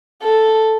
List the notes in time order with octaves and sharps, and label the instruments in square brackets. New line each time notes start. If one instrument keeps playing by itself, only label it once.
[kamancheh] A4